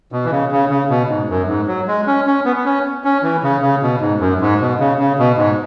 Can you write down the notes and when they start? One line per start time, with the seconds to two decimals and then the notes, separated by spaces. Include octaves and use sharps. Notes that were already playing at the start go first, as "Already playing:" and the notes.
0.12 B2
0.25 E3
0.32 C#3
0.51 C#3
0.70 C#3
0.89 B2
1.09 G#2
1.29 F#2
1.48 G#2
1.67 F#3
1.88 G#3
2.07 C#4
2.26 C#4
2.45 B3
2.56 B3
2.65 C#4
3.04 C#4
3.23 E3
3.43 C#3
3.62 C#3
3.82 B2
4.01 G#2
4.20 F#2
4.41 G#2
4.60 B2
4.80 C#3
4.99 C#3
5.19 B2
5.37 G#2